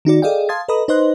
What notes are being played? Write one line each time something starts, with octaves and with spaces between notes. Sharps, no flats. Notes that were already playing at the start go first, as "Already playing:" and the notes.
D#3 D#4 F#4 D5
G#4 A4 D5 D#5 F5 G5
F5 A5 C6 D#6 G#6 A6
A4 B4 D#5 A#5 B5 D#6
D#4 B4 C5 D#5 C6 F#6